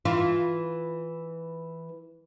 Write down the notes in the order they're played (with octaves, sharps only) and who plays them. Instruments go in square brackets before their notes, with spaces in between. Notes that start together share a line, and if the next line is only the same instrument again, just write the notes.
[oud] E3 F4